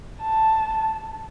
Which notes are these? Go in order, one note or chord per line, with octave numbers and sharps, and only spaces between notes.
A5